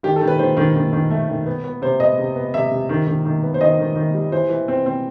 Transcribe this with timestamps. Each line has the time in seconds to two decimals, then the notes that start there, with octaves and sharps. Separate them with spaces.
0.03 D#3 G4
0.16 A4
0.21 D#3
0.28 B4
0.39 D#3 C5
0.57 D#3
0.76 D#3
0.93 D#3
1.10 A3
1.28 D#3
1.46 B3
1.64 B3
1.82 C3 C5
2.00 B3 D#5
2.18 C3
2.36 B3
2.54 C3 E5
2.71 C3
2.89 D#3
3.07 D#3
3.25 D#3
3.43 B3
3.54 C5
3.61 D#3 D#5
3.79 D#3
3.96 D#3
4.14 G3
4.32 E3 C5
4.50 E3
4.68 C4
4.86 C4